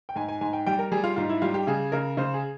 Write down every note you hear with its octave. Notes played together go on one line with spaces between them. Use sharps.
G5
G#2 G#5
G#5
G#2 G#5
G5
G3 G5
A#4
G3 G#4
F4
G#2 F4
E4
G3 F4
G4
C#3 G#4
C#3 A#4
C#3 C5
G#4